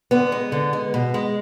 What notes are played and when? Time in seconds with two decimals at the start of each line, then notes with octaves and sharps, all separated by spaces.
0.11 D3 B3
0.32 G#3
0.52 D3
0.73 G#3
0.94 B2
1.14 G#3